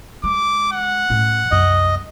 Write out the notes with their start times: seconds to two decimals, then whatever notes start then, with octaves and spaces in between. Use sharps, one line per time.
0.24 G#3 D6
0.72 F#5
1.10 A2 C#4
1.51 C2 F#2 D#5